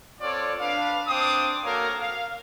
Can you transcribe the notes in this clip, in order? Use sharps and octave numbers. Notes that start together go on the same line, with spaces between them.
C4 F4 A4 C#5 D5
D4 B4 F5
C4 D4 G5 D6 D#6
A#3 F#4 A4 A#4 C#5 F5
F5